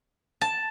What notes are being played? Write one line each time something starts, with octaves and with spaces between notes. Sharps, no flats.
A5